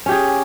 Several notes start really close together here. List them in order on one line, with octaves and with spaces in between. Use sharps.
C#4 G4 G#4